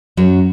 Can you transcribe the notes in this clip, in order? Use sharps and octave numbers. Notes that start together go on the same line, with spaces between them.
F#2 F#3